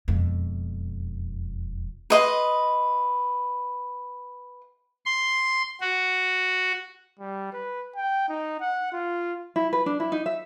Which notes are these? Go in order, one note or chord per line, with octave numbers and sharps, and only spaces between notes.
E1 F2
B4 D#5 C6
C6
F#4
G3
B4
G5
D#4
F#5
F4
E4
B4
D4
E4
D#4
E5